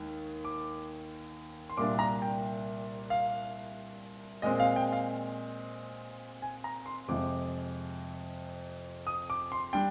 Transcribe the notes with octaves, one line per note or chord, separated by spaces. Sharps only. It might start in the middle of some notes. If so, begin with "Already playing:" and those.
Already playing: D#2 D#3 G#3
D6
C6
C2 A#2 G3 A#3 D4 D6
A#5
G5
F5
A#2 G#3 C4 D#5
F5
G5
F5
G#5
A#5
C6
F2 C3 F3 G#3 D6
D#6
D6
C6
G3 D4 G5